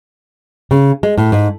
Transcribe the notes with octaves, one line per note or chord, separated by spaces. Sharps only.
C#3
G#3
A2
G#2